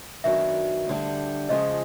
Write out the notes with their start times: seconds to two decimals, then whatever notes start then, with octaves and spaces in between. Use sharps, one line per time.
0.24 F#2 D#3 F#3 B3 D4 E5
0.87 D2 D3 G3
1.49 F2 C#3 F3 G#3 D#5